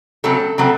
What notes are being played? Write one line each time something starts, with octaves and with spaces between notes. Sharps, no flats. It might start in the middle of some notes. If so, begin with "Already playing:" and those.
C#3 F#3 A3 C4 A4
C#3 F#3 A3 C4